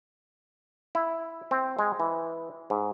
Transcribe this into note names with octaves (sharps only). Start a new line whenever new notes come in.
E4
C4
G#3
E3
G#2